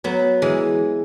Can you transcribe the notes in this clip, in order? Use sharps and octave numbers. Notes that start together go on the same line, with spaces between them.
F#3 B3
E3 G#3